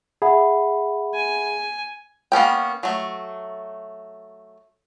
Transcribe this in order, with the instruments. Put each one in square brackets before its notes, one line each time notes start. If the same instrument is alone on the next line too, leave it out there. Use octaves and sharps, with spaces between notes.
[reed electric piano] G#4 [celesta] E5 F#5 B5
[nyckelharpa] G#5
[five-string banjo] A#3 B3 C#4 G5
F#3 A3